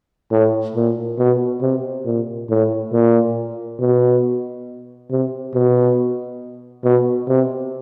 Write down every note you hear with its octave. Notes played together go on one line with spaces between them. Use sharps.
A2
A#2
B2
C3
A#2
A2
A#2
B2
C3
B2
B2
C3